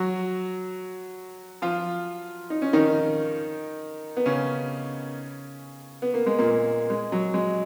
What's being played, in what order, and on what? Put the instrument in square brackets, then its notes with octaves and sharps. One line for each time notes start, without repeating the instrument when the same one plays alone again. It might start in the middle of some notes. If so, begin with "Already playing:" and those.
Already playing: [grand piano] F#3 F#4
F3 F4
D#4
C#4
D#3 D#4
B3
C#3 C#4
B3
A#3
G#3
A#2 A#3
G#3
F#3
G#3